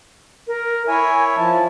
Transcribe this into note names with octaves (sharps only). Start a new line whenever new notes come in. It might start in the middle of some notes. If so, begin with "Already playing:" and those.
A#4
E4 C#5 E5 G#5
F3 A5